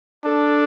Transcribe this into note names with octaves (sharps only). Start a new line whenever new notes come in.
D4 A4